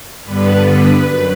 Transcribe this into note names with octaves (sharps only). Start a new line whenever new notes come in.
G2 D3 G3 B3 B4
B4
F#2